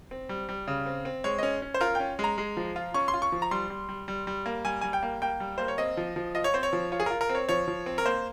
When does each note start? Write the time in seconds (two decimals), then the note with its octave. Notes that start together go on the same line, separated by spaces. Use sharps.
0.11 C4
0.29 G3
0.49 G3
0.68 C#3
0.86 C4
1.05 C4
1.24 G#3 C#5
1.39 C#4 D#5
1.62 C#4
1.74 C5
1.81 F4 A#4
1.95 C#4 G5
2.19 G#3 A#5
2.38 G#3
2.57 F3
2.76 F4
2.94 C#4 C#6
3.08 C6
3.14 F4
3.22 C#6
3.32 F3
3.42 A#5
3.51 G3 C6
3.70 G3
3.89 G3
4.08 G3
4.27 G3
4.46 A#3
4.65 G3 G#5
4.81 G3 G#5
4.93 G5
5.03 A#3
5.22 A#3 G5
5.40 G3
5.58 A#3 C5
5.68 C#5
5.78 C4 D#5
5.97 F3
6.16 F3
6.35 F4 D#5
6.44 C#5
6.54 C4 C5
6.63 C#5
6.73 F3
6.92 F4 C#5
7.00 G#4
7.06 F4 A#4
7.21 A#4
7.30 C4
7.35 C#5
7.49 F3 C#5
7.68 F3
7.86 C4
7.98 A#4
8.06 A#3 C5